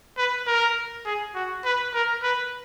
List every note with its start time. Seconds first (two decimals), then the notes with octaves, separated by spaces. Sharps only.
0.17 B4
0.47 A#4
1.06 G#4
1.35 F#4
1.65 B4
1.94 A#4
2.23 B4